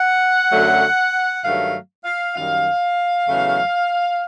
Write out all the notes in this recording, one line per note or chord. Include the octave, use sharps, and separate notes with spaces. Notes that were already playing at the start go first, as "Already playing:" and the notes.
Already playing: F#5
F#2 D3 F#3 A3
G2 D#3 F#3 A3 F5
F5
F#2 D#3 G3 F5
E2 C#3 F#3 A3